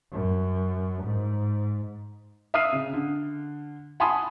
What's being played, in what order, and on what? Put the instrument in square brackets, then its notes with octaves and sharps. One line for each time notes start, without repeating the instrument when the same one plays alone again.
[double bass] F#2
G#2
[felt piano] E5 F5 D#6 F6 C7 D#7
C#3
D3
F#5 G#5 A5 B5 C6 D#6